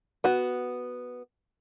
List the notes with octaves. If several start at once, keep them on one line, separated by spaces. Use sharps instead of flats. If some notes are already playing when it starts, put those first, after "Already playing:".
B3 F#4